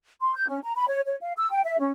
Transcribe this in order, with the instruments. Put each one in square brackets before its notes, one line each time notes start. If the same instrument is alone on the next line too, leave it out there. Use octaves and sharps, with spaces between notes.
[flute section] C6
G6
C#4
A#5
B5
C#5
C#5
F5
E6
G5
E5
C#4